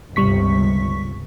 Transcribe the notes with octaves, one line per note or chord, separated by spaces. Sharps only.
G1 C#2 C3 G3 C#6 B6